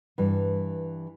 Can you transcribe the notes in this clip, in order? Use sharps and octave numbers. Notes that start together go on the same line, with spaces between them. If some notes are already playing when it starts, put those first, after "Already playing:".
G2 E3